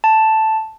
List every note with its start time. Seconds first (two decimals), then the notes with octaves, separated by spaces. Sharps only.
0.04 A5